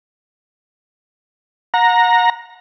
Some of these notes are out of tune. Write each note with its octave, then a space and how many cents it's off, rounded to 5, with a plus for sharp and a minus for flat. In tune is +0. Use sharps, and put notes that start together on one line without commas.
F#5 -30 A#5 +0